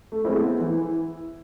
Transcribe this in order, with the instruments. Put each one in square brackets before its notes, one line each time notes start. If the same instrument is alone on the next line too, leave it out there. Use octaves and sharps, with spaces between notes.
[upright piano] A3
[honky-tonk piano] G#3 C4 E4 [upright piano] A3
[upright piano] B3
[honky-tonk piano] E3 [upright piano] E4